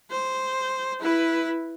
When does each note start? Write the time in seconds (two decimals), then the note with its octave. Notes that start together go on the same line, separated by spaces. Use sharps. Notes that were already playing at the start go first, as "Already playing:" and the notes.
0.11 C5
1.00 E4 B4